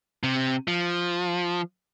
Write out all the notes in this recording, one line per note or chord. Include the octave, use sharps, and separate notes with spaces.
C3
F3